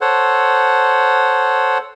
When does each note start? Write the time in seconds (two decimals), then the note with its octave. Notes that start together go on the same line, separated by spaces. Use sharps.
0.01 A4 C5 C#5 F#5